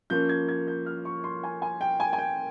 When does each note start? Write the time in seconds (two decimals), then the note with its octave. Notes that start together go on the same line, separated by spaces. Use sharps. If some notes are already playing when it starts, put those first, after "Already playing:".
0.10 F3 A#3 C#4 G6
0.29 G#6
0.49 G#6
0.68 G6
0.86 F6
1.05 C#6
1.24 C6
1.44 G#5
1.62 G#5
1.81 G5
2.00 G#5
2.13 G#5
2.18 G5